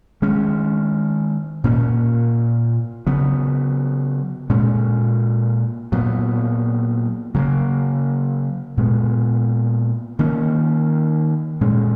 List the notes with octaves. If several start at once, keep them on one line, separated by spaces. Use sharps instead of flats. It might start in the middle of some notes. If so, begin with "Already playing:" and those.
D#3 G#3 C#4
A#2 A#3 C#4
C#3 F#3 B3
A#2 G#3 C#4
A#2 F#3 B3
C#3 F#3 A#3
A#2 G#3 B3
D#3 A#3 C#4
A#2 G#3 C#4